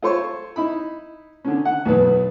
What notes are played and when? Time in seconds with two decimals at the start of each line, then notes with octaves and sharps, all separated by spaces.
0.03 F4 A4 C5 C#5 C6 C#6
0.56 D#4 E4 B5
1.44 D3 D#3 C#4
1.65 F#5
1.85 B1 E2 B3 B4